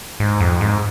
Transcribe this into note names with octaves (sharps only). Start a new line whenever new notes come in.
G#2
F2
G#2